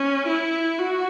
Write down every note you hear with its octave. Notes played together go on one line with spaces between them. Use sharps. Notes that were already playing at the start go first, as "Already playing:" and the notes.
Already playing: C#4
E4
F#4